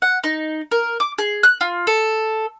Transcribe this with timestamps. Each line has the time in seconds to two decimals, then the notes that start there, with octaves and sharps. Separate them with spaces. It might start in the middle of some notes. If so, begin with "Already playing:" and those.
0.02 F#5
0.24 D#4
0.71 A#4
1.00 D6
1.18 G#4
1.43 F#6
1.61 F4
1.87 A4